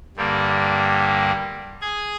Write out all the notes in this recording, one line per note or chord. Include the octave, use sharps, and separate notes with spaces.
G2 D3 G3 A#3
G#4 G#5